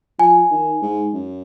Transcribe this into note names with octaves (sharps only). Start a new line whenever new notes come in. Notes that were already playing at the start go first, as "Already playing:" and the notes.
F3 G#5
D#3
G#2
F#2